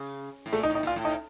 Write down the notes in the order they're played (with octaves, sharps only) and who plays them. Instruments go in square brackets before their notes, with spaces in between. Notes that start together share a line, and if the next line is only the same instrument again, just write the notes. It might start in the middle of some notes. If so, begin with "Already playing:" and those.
Already playing: [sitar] C#3
A2
[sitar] A#2 [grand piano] A3
[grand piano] D#4
[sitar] A2
[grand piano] D#4
[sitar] A#2 [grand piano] F4
[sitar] A2
[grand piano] D#4